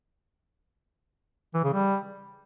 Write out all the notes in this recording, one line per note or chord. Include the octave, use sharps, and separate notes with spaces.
E3
C#3
G3